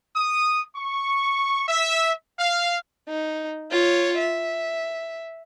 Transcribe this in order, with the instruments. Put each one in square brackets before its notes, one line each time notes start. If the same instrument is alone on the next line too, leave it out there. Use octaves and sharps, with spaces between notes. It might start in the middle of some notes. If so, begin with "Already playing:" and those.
[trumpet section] D#6
C#6
E5
F5
[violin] D#4
F4 C#5
E5